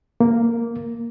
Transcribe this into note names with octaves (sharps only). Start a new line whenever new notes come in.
A#3